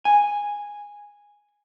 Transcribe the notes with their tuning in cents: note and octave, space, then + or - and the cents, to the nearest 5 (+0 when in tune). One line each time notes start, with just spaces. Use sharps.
G#5 -10